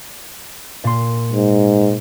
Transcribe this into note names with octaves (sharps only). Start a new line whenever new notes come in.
A#2 C6
G#2